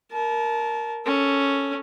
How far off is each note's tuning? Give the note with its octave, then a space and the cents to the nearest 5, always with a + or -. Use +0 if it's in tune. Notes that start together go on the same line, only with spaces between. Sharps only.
A#4 +0 A5 -25
C#4 +0 A4 +0